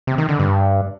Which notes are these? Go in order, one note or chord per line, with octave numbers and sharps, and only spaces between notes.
C3
D#3
D3
G2